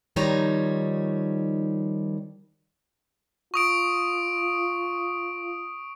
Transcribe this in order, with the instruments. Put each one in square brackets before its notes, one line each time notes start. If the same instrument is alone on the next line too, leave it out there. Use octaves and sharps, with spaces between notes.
[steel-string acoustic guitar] D#3 F3 G3 D#4 C#5 A#5
[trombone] F4 [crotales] C#6 D#6 D7